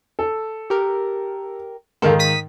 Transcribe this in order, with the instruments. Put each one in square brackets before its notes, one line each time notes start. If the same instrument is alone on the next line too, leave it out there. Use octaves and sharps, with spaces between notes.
[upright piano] A4
[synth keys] G4 A#4
[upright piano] G#2 D#3 F5 [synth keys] A4 A#4
[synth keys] D#6 B6 D#7